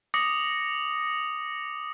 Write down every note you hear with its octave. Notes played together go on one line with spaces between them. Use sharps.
D6 D#6 A#6 C#7